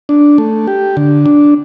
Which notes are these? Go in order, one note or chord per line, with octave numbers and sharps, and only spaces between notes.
D4
A3
G4
D3
D4